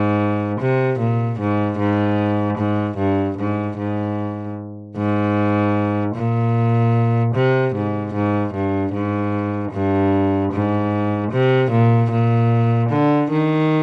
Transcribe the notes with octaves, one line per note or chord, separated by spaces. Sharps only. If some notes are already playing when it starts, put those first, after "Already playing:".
Already playing: G#2
C3
A#2
G#2
G#2
G#2
G2
G#2
G#2
G#2
A#2
C3
G#2
G#2
G2
G#2
G2
G#2
C3
A#2
A#2
D3
D#3